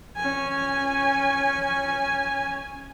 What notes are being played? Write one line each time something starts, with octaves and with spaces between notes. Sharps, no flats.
C#4 G#5